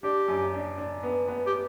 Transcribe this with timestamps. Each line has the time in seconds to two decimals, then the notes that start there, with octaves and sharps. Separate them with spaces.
0.03 D4 G4
0.28 F#2
0.53 D4
0.78 D4
1.03 B3
1.28 B3
1.46 G4